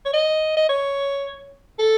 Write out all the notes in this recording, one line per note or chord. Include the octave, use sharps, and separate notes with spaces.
C#5
D#5
D#5
C#5
A4